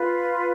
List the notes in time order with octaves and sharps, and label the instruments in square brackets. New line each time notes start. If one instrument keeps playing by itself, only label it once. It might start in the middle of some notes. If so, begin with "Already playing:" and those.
Already playing: [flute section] F4 B4